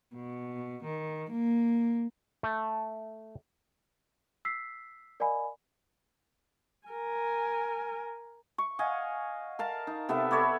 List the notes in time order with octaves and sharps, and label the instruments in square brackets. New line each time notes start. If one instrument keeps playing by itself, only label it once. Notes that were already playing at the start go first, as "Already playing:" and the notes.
[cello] B2
D#3
A#3
[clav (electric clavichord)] A3
[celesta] E6 B6 C7
A#4 D5 D#5 F5 G#5 B5
[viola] A#4 G#5
[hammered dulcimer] C#6
D#5 F5 F#5 G#5
A#4 F5 A5
D#4
C3 B3 A4 E5
A4 C#5 D5 B5